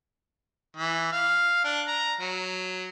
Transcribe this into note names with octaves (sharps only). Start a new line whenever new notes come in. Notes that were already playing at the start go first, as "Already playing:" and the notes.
E3
F5
D4
A#5
F#3